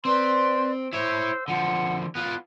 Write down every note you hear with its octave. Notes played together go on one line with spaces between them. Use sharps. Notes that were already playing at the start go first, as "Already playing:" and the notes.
C4 B4 C5 D5 C6
E4 C5 C#5 E6
D3 F3 F#5
B3 F4 F#6